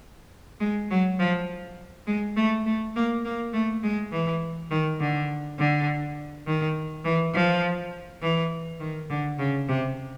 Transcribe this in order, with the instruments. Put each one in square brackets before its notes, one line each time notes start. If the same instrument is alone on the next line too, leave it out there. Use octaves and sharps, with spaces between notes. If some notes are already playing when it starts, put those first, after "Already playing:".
[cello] G#3
F#3
F3
G#3
A3
A3
A#3
A#3
A3
G#3
E3
D#3
D3
D3
D#3
E3
F3
E3
D#3
D3
C#3
C3